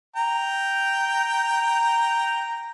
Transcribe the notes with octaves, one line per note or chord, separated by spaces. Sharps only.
G5 A#5